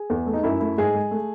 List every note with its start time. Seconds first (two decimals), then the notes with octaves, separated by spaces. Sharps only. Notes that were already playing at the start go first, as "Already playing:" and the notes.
Already playing: G#4
0.10 E2
0.26 A3
0.34 D#4
0.43 F#2 E4
0.60 A3 E4
0.78 G#2 G#4
0.95 G#3
1.11 A3